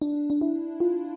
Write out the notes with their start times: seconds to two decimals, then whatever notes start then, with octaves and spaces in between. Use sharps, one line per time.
0.02 D4
0.30 D4
0.41 E4
0.80 F4